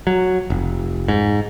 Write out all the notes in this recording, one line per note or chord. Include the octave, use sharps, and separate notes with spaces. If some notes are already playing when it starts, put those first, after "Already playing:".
F#3
F1
G#2